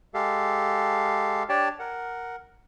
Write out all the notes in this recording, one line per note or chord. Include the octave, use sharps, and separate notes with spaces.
G#3 G4 A4 F5
D4 G4 C#5 D5 G5 A5
A#4 F#5